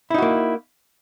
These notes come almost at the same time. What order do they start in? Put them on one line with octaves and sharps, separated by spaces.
E4 D#4 F#4 A#3